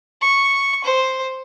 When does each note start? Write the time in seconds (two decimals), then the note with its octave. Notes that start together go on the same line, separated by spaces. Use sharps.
0.22 C#6
0.85 C5